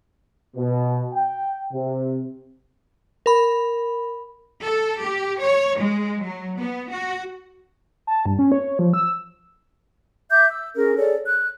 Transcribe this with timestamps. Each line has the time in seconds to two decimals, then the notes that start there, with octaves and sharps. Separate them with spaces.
0.57 B2
1.14 G5
1.73 C3
3.26 A#4 B5
4.62 A4
5.03 G4
5.40 C#5
5.78 G#3
6.23 F#3
6.59 B3
6.91 F#4
8.07 A5
8.26 G2
8.39 C#4
8.52 C#5
8.79 F3
8.94 E6
10.31 E5 D6 G6
10.49 E6
10.76 C#4 G#4 A#4
10.97 G#4 A4 C#5 D5
11.26 F#6